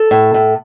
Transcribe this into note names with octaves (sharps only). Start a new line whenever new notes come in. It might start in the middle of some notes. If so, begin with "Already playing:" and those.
Already playing: A4
A2
A2